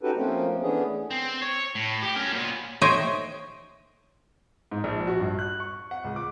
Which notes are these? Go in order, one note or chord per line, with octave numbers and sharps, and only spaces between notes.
C#4 D#4 F#4 G4 A4 B4
F3 A3 A#3 C4 C#4
E3 A3 B3 C#4 D4 G#4
C4
C#5
A2
G4
C#4 A#4
A#2 B3
C5 C#5 D#5 E5 G5
G#2
A#1
F#4
G2
F#6
C#6
F#5
C#2
D6